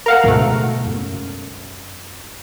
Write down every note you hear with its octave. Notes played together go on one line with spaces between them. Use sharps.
A#4 F5 F#5
D2 G#2 B2 A3 B3
F#2